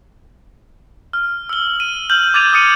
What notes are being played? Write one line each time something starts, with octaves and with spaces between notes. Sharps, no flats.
F6
E6 G7
D#7
F6 G6 F#7
D6 G#6 A6 D#7 F7
D#6 F6 A6 C#7 D#7